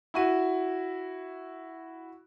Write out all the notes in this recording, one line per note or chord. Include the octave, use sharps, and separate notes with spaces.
E4 F#4 D#7